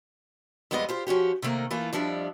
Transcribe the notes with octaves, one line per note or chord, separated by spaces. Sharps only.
F2 G3 G#3 B3 E4 D#5
F4 G4 C5
F3 C#4 F#4 G4
C3 D#3 A3 A#3
E3 A3 A#3 F4
F2 F3 G3 D4 E5